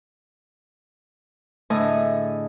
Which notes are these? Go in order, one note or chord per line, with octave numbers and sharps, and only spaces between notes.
A2 D3 A3 G#4 D#5